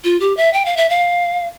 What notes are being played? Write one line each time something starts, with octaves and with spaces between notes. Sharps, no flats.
F4
G4
E5
G5
F5
E5
F5